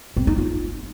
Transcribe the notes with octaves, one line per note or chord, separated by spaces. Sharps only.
C4
D#4
F4